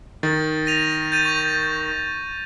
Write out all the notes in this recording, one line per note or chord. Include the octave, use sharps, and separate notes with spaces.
D#3 A6
A#6 D#7 F7
G6 A6 D#7
C#6 F7